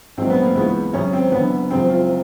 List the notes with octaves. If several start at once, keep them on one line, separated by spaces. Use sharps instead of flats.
A#1 G#2 D#3 F#3 C4
B3
A#3
C#2 C#3 E3 G#3 B3
G#1 F#2 C#3 C#4
C4
F#1 F#2 D3 B3
F#1 F#2 C#3 F3 C4
F4